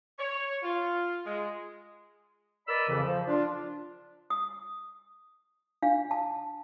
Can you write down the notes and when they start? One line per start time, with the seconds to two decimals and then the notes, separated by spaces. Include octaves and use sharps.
0.19 C#5
0.63 F4
1.26 G#3
2.68 A#4 B4 D5 D#5 B5 E6
2.89 F2 C#3 E3
3.04 F3
3.28 D4 F4
4.30 D#6
5.82 D4 F5
6.11 A5